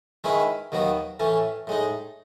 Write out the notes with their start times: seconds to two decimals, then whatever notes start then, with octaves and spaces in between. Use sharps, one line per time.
0.24 D#3 G#3 C#4 E4 B4
0.72 D#2 D#3 F#3 B3 F#4
1.20 A2 E3 A3 C#4
1.67 A2 G#3 D#4